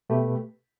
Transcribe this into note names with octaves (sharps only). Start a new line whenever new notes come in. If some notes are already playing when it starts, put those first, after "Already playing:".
B2 A3 G4 B4